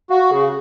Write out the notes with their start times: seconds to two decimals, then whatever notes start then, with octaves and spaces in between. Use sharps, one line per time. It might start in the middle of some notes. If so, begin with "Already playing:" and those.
0.10 F#4 F5
0.31 C#3 G#4